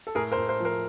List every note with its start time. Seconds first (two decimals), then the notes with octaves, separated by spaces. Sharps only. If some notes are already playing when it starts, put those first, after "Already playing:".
0.07 A4
0.15 A2 G#4 A#4
0.32 A#4 C5
0.37 A2
0.49 A#4 C5
0.60 F3 A#4 C5